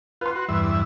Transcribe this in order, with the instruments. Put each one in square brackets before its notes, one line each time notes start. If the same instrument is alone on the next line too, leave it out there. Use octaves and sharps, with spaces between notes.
[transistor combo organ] F4 [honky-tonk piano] B4 C6
[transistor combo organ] F#4
E2 G2 E5